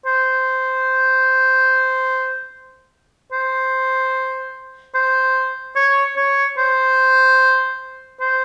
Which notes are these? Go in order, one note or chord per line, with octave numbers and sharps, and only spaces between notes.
C5
C5
C5
C#5
C#5
C5
C5